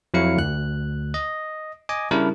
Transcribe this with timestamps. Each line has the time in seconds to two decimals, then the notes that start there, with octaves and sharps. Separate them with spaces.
0.14 F2 F#3 E4 F5 C#7
0.37 D2 F#6
1.14 D#5
1.89 D#5 G#5 D6
2.11 C#3 G3 D4 E4 A#4